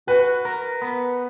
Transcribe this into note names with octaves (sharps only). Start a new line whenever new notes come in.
F#4 B4
A#4
B3